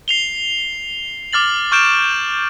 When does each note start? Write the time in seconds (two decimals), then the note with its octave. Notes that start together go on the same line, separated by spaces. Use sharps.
0.08 C7 F7 G7
1.33 D6 F6 A6 F#7
1.72 C#6 F6 G6 D7 E7